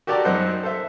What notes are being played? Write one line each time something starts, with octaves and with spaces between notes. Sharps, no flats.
F#4 G4 A4 D5 A5 A#5
F#2 F#3 D#4 C5 F#5 F#6
A4 C5 E5